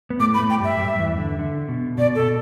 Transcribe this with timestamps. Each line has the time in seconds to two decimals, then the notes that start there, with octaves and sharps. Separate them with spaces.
0.10 B3
0.19 A2 A3 D6
0.34 B5
0.40 A2 A3
0.50 G5
0.60 G2 G3 E5
0.79 G2 G3
0.98 E2 E3
1.18 D3
1.39 D3
1.69 B2
1.98 B2 D5
2.15 B2 A4